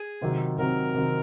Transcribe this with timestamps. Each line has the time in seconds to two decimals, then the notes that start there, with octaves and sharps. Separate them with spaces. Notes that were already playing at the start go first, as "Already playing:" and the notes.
Already playing: G#4
0.21 C3 D#3 F#3 C4 F4
0.58 C3 D#3 F#3 C4 F4 A#4
0.94 C3 D#3 F#3 C4 F4